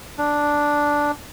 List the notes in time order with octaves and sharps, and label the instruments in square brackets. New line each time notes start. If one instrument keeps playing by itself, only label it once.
[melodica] D4